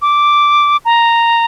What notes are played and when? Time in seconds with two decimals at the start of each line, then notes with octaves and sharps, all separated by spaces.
0.02 D6
0.85 A#5